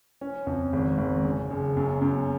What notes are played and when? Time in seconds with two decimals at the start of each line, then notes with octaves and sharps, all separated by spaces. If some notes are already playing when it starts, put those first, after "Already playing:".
0.21 C#4
0.47 F2
0.73 G#1
0.98 G#1
1.25 C#3
1.50 F#1
1.77 F#2
2.01 F#2